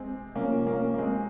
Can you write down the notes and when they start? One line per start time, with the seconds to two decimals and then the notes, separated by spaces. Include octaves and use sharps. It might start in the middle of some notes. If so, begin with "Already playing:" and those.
Already playing: C3 G#3 C4
0.35 C3 F3 A#3 C#4
0.67 A#3 C#4
0.94 A#3
0.98 G#3 C4